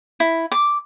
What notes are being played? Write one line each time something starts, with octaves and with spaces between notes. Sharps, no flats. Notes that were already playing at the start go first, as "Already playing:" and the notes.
E4
D6